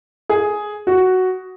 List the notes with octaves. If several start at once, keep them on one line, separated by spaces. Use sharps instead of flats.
G#4
F#4